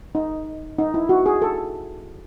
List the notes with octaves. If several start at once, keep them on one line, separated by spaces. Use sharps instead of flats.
D#4
D#4
E4
F#4
G#4
A4